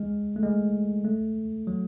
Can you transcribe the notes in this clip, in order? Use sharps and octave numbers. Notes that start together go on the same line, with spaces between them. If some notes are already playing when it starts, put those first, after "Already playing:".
Already playing: G#3
A3
G#3
A3
F#3